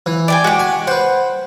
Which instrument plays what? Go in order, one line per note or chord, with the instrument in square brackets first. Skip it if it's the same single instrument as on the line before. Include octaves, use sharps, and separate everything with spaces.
[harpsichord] E3
[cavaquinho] D5 G5 G#5
[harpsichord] G#3 [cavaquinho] F#4 G4
[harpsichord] G#5
[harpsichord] B4 C5 [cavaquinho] F#5